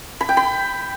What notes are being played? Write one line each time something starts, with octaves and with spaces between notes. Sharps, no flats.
B5
G5
B5